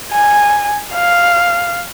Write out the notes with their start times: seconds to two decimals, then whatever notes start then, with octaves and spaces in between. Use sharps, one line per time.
0.12 G#5
0.94 F5